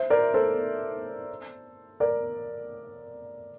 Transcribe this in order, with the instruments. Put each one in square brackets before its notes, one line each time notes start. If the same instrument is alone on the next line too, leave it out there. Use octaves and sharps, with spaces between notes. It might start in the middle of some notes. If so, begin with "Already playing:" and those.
Already playing: [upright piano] C5 E5
A#4 D5
A4 C5
A#4 D5